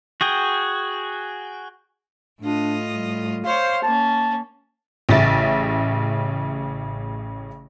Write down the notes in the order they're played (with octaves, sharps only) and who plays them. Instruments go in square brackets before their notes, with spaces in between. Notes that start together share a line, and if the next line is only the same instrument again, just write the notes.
[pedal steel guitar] F#4 G#4 G5
[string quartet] A2 F4 D#5 [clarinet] D4
[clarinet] G3
[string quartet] C5 C#5 C6 [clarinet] F5
[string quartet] A#3 C#4 [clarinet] A5
[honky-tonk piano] A1 C#3 E5 A6